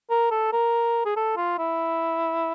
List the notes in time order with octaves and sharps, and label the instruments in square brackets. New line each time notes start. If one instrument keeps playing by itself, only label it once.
[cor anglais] A#4
A4
A#4
G#4
A4
F4
E4